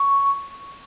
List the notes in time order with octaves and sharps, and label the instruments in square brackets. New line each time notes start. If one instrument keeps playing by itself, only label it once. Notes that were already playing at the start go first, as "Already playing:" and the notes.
Already playing: [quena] C#6